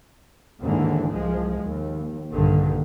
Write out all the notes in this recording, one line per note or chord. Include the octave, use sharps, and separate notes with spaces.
D#2 G#2 D3 E3
C2 F3 G#3
D#2
A#1 G2 D3 D#3